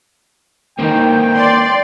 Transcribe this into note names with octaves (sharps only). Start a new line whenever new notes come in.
D#3 A#3 C4 G5
D5 C6